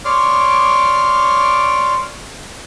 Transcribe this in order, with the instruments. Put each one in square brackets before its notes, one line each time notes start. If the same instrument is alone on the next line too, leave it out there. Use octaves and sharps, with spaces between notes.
[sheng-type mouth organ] C#5 D5 C6 D6 F6